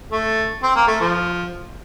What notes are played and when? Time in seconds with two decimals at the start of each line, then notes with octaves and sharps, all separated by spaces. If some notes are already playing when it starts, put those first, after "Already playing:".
0.12 A3
0.63 C4
0.75 A#3
0.87 A3
1.00 F3